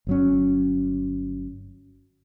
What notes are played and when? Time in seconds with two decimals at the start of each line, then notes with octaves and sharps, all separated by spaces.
0.07 G1 F#3 C#4